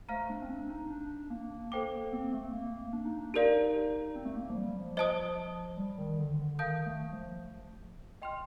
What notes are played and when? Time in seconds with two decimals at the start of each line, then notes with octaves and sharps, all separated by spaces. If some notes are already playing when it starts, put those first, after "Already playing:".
0.09 A3 C5 F5 A#5 F6
0.30 D4
0.42 C4
0.50 D4
0.70 D#4
0.90 D4
1.30 A#3
1.72 A#3 A4 C5 G5 D6
1.91 A#3
2.13 C4
2.33 A3
2.53 A#3
2.93 D4
3.05 D#4
3.18 D4
3.34 D#4 G4 A#4 D5 F5
4.16 C4
4.25 A3
4.36 A#3
4.50 F3
4.55 G3
4.76 F3
4.97 C5 D#5 A5 D#6
5.77 G3
5.98 D#3
6.18 D3
6.39 D3
6.52 D3
6.59 D#3 F5 A5 D#6 G6
6.86 A3
7.13 F3
8.22 D#5 G5 C6 F6